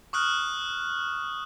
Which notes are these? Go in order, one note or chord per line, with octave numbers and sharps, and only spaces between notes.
C#6 D#6 F6 F#6